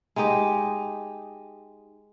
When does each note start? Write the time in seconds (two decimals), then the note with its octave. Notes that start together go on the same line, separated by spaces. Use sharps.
0.16 G#3 D#4 G4 D#5